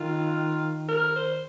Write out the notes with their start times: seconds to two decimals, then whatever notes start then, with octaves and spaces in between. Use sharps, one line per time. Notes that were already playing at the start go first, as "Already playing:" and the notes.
Already playing: D#3 F4
0.88 A#4
1.16 C5